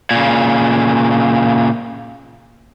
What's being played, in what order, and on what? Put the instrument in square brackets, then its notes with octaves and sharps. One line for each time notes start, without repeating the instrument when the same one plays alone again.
[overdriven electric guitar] A#2 C#3